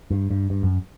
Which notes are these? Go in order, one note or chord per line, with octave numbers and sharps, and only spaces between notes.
G2
G2
G2
F#2